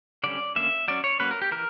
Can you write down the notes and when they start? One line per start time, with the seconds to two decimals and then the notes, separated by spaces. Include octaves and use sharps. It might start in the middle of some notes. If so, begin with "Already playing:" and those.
0.24 D3 G3 C#4 D5
0.56 D3 A#3 C#4 E5
0.88 F#3 C#4 D5
1.04 C#5
1.19 F#3 A#3 C#4 B4
1.31 A#4
1.42 G4
1.51 E3 A#4